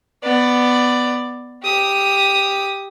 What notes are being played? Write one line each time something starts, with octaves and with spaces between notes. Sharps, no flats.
B3 D5
G4 D#6